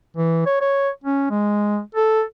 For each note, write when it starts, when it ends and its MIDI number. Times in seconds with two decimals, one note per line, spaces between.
0.17 0.42 52
0.46 0.60 73
0.61 0.89 73
1.04 1.25 61
1.30 1.79 56
1.95 2.23 69